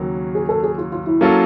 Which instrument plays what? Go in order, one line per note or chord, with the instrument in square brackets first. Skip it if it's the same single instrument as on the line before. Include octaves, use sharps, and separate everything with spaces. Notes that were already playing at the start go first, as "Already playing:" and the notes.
Already playing: [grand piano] D#2 C#3 F#3 A#3
[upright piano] G#4
A4
G#4
F4
F4
E4
[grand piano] F#3 A#3 C#4 F4 A4